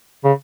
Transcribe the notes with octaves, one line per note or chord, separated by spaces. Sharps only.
C#3